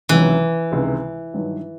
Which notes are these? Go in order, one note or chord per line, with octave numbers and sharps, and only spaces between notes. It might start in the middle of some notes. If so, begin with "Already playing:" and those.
C#2 C3 D#3 E3 F#3
C#2 C3 D#3 G#3
G2 D#3 F#3